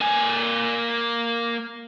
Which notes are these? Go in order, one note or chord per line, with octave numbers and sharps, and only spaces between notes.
A#3 G#5